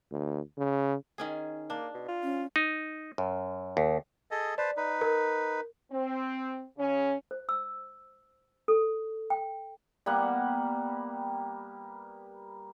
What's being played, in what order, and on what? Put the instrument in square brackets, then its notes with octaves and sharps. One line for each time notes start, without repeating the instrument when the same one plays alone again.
[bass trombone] D2
C#3
[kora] D#3 C#4 G#4
[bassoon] A#3 [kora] D4
[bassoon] B2
F4
[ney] C#4
[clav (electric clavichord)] D#4
F#2
D#2
[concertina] G#4 A4 D#5
[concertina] B4 C5 A5 [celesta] D5
[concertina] D#4 B4
[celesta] A#4
[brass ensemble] C4
C#3 C#4
[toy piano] C5
E6
A4
G5
[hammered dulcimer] G3 A#3 B3 F#5